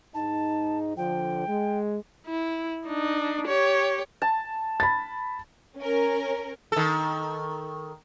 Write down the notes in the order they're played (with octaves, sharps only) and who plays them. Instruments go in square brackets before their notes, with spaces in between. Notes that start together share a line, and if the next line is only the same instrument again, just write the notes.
[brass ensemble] G#2 D#4 [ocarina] A5
[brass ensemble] D3 F3 [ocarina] G5
[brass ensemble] G#3
[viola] E4
D4 D#4
G4 C#5
[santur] A5
[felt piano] B5 A6
[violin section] C#4 A#4
[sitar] D#3 A4